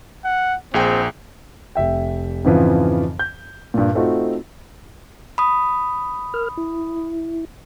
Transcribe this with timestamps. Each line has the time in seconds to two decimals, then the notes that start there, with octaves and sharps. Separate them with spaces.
0.25 F#5
0.74 A#1 C4 G#4 G5
1.75 F1 E5 G5
2.44 F2 G#2 C#3 E3 F3
3.19 G6
3.74 G2 A#2
3.95 A3 C4 D#4 F4 F#4
5.38 B5 D#6
6.34 A#4 F6
6.57 E4